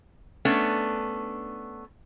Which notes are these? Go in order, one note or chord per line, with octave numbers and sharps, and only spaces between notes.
A3 B3 C#4 D4